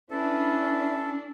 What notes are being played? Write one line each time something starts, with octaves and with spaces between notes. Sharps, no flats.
C#4 D4 E4 A4 B4